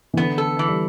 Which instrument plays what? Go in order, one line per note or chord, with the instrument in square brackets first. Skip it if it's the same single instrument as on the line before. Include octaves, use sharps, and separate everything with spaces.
[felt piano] E3
[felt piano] D3 [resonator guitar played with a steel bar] B3
[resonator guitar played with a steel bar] A4
E3
[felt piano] G3